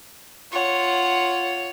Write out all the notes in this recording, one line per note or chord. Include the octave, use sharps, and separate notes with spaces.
F4 C#5 F#5